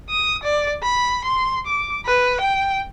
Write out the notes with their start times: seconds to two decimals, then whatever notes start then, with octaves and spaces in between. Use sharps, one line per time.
0.10 D#6
0.43 D5
0.83 B5
1.24 C6
1.66 D6
2.06 B4
2.40 G5